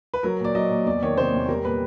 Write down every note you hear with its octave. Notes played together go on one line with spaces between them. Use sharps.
B4
F#3 A#4
A#2 D5
F#3 D#5
A#2
E2 D5
D#3 C#5
C3 C5
E2
G3 A#4
A#2 B4